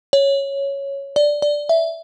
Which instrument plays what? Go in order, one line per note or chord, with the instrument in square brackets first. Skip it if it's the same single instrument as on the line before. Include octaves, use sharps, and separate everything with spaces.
[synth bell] C#5
D5
D5
E5